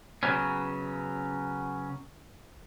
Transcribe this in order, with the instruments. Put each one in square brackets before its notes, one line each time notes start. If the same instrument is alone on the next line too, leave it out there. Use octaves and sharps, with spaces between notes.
[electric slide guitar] C#3 F#3 B3 C#4